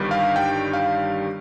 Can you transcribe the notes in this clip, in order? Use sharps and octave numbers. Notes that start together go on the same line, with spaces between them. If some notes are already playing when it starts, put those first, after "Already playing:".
Already playing: G1 G2 D#3 G3
F5
G5
F5